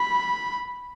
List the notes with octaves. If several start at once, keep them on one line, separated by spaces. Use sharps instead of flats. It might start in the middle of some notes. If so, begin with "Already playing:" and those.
Already playing: B5